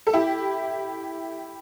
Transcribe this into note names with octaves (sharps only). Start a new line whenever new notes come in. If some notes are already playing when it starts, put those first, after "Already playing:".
A4
E4 G4